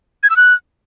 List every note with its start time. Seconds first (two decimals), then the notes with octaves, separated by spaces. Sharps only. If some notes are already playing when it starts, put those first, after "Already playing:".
0.23 G#6
0.30 E6
0.37 F#6